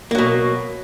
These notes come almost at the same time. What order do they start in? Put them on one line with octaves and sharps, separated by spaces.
A#3 F#3 B2